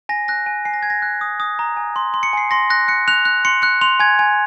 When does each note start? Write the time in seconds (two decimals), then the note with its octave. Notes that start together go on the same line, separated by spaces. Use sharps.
0.09 G#5 A#6
0.28 F#6 A#6
0.46 G#5
0.65 G#5 C7
0.74 A#6
0.83 G#5 G#6
0.90 A#6
1.02 F#6
1.21 D#6
1.40 D#6
1.59 A#5
1.77 G#5
1.96 C6
2.14 C6
2.23 C#7
2.33 G#5 C7
2.51 C6 A#6
2.70 F#6 A#6
2.88 F#6 C#7
3.08 F#6 F7
3.25 F#6
3.45 C6 C#7
3.62 F#6 C#7
3.81 C6 F7
4.00 G#5 G#6
4.19 G#5